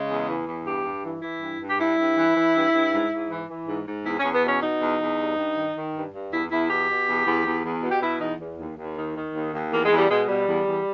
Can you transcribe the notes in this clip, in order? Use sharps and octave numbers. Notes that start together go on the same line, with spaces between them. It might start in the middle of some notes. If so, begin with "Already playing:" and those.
Already playing: C#3 G#3
E2
E3
E2
G2 G4
G2
E3
E3 E4
G2
G2
G4
G2 E4
G2
E3
E3
G2
G2
G#2
G#2
E3
E3
G#2
G#2
E2 E4
C#4
E2
B3
B2 C#4
B2 D#4
E2
E2
G2
G2
D#3
D#3
G2
G2
E2 E4
E2 E4
B2 G4
B2
E2
E2
E2
E2
B2
G4
B2 E4
E2 D#4
E2
D#2
D#2
D#3
D#3
D#2
D#2
E2 A#3
G#3
E2
G3
B2 G#3
B2 G3
E2
E2